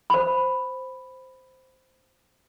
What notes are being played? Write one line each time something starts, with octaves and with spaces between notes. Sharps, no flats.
C5 B5